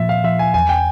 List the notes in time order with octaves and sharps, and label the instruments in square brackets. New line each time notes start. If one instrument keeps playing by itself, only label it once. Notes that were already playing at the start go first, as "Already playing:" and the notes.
Already playing: [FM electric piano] A#2 F3 [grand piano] E5
[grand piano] F5
[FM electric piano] F3 [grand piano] E5
[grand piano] G#5
[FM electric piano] E2 [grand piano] G#5
[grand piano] G5